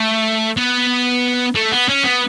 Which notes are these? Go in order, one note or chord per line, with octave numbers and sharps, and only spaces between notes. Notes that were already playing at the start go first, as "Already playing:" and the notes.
Already playing: A3
B3
A3
B3
C#4
B3